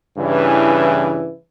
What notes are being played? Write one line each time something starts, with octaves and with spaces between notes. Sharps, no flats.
G2 C#3 E3